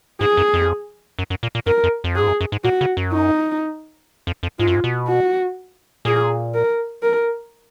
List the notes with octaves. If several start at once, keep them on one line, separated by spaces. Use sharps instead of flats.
G#2 G#4
F#2
F2
F#2
F#2
A#2
A#2
F#2 A#4
F2
F2
F#2 G#4
G#2
F#2
F#2
G#2
A#2 F#4
C#3
F#2
D#4
F2
F2
G#2 F4
F#2
G#2
B2
F#4
A#2 G#4
A#4
A#4